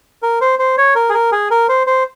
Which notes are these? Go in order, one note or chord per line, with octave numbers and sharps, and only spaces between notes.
A#4
C5
C5
C#5
A#4
G#4
A#4
G#4
A#4
C5
C5